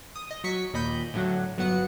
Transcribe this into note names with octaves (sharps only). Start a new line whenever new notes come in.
D#6
D#5
F#3 C#6 B6 C#7
D#2 A#2 D#5 B5 G6
A2 D3 F#3 F#5
G1 F#3 B3 F#5 C#7